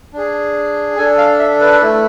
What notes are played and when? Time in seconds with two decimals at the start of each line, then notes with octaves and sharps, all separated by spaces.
0.13 D4 G#4
0.97 D4 A4 G#5
1.18 F5
1.39 E5
1.60 B4
1.81 A3 E4 A4